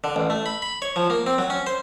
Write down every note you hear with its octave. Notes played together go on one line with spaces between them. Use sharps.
D3
A1
A3
B5
B5
C#5
F3
A#3
C4
F#3
C#4
C5